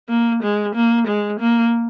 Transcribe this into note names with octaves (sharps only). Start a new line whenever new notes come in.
A#3
G#3
A#3
G#3
A#3